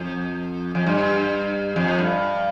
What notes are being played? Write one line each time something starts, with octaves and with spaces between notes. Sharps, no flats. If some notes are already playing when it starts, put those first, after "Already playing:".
Already playing: F2
F2
G2
F2
G2